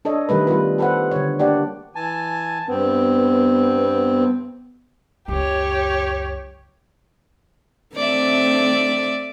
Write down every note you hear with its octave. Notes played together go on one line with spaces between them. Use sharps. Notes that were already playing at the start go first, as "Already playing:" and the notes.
D4 A4 C#5 D#5
D#3 G3 A3 B4
G3 B3 F4 B4
G4 A4 B4 C5 F#5
D3 G3 C#5
A#3 D4 G4 D5 F#5
E3 G#5 A5
G2 B3 C4
C#2 F#2 G4 C#5
A3 C4 D5 E5